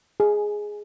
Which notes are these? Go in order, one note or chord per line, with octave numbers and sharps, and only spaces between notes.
G#4